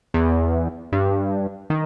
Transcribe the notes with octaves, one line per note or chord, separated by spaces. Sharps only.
E2
G2
D#3